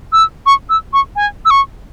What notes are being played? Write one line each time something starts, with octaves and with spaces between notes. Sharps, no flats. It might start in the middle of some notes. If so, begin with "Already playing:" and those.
E6
C#6
E6
C#6
G#5
E6
C#6